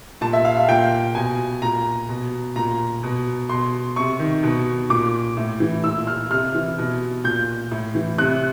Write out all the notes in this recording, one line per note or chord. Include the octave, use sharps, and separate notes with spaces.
A#2 A5
E5
F5
F5
A#2 G5
B2 G#5
A#2 A#5
B2
A#2 A#5
B2
B2 C6
C3 C#6
D#3
B2
A#2 D6
A2
E3
A#2 E6
F6
C3 F6
E3
B2
A#2 G6
A2
E3
C3 F#6